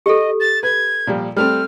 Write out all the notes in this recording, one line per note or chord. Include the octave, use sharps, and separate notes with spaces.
G4 A4 D#5
A6
B4 G#6
A#2 F3 G3
G3 A3 C4 F6